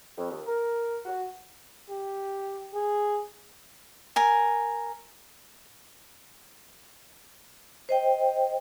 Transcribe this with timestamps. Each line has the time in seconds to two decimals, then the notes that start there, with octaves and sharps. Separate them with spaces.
0.17 F2
0.31 D#2
0.46 A#4
1.06 F#4
1.90 G4
2.74 G#4
4.16 A#4 G#5
7.89 C5 D#5 G5